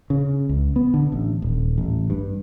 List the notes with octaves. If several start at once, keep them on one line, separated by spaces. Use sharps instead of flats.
C#3
C#2
B3
D3
A1
D#1
A1
G2